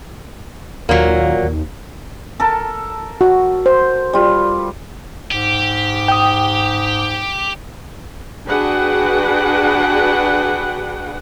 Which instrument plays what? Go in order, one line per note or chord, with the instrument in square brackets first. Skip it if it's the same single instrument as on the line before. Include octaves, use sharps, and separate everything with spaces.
[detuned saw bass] D#2 [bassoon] A#2 [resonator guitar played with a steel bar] F#3 A#3
[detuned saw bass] D#2
[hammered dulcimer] A4 A#4 A5
[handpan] F#4
C5
[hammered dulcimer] G3 F4
[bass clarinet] G#2 [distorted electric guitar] G4
[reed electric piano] G5 D#6
[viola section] D4 F#4 G#4 B4 F#5 G5